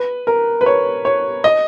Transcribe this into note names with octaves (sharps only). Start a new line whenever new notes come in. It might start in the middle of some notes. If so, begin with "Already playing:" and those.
Already playing: B4
A#4
B4
C#5
C#5
D#5